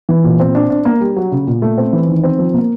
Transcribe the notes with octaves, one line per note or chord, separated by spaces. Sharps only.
E3
A#2
C4
D4
D4
A#3
G3
F#3
C#3
A#2
A3
C4
E3
D#3
C4
F3
A#3